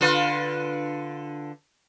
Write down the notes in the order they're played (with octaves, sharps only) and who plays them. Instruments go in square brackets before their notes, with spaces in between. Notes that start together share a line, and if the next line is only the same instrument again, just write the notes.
[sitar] D3 F4 B4